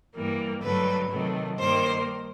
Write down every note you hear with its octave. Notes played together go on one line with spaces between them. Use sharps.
G2 E3 G3 A#3
G2 D3 F#3 A3 B4
C3 D#3 F#3 A3
G2 D#3 G3 A#3 C5